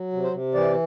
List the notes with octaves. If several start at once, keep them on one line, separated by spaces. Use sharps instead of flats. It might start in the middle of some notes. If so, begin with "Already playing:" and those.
Already playing: F#3
C3
C5
C3
E3 D5